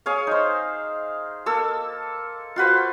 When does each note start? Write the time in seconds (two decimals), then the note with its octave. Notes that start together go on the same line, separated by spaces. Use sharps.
0.06 G#4 C#5 F5
0.27 D#4 C5
1.46 A#3 A4 E6
2.56 F4 F#4 B4 C5